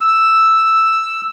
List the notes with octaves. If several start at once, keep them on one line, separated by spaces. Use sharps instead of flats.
E6